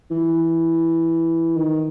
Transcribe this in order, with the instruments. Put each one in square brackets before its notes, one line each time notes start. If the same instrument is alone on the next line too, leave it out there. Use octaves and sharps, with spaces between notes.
[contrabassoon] E3
D#3